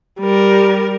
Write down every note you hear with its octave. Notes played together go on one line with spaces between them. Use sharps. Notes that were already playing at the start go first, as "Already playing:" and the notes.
G3 A#4